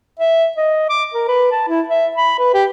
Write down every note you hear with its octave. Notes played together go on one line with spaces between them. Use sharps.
E5
D#5
D6
A#4
B4
A5
E4
E5
B5
B4
G4